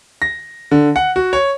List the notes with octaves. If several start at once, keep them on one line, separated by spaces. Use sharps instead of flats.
A#6
D3
F#5
F#4
C#5